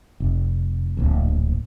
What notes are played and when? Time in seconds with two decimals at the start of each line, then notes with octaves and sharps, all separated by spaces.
0.20 F1
0.97 D1 A#1